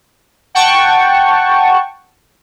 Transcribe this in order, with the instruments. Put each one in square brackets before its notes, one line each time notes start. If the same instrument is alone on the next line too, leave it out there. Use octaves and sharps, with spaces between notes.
[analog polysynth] F#5 G5 A5 C#6